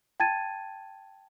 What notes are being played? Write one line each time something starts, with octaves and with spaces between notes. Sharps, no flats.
G5 A5 G#6 A6 D#7